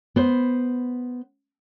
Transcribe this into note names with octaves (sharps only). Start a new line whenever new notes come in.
B3 C5